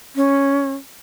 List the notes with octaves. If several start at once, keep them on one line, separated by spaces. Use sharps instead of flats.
C#4